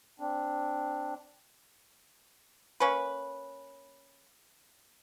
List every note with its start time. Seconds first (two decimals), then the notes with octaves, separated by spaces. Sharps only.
0.20 C4 D4
2.80 A#3 C#4 B4